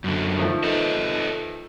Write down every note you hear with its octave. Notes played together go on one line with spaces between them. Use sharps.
F#2 D3
D#3 F3 A3
A4 B4 D#5